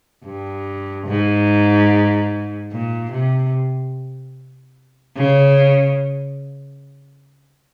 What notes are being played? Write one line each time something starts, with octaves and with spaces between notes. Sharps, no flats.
G2
G#2
A#2
C3
C#3